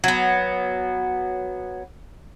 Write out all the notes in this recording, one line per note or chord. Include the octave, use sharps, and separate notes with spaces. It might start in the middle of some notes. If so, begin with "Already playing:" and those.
F#3 B3